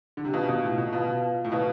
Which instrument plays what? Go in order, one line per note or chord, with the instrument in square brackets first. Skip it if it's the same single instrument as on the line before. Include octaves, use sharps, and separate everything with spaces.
[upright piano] D3
C3
[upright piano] B2 [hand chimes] F4 B4 F5 A5
[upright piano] C3
B2
A2
B2
[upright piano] B2 [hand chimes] F4 B4 F5 A5
[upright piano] A2
[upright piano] B2 [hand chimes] F4 B4 F5 A5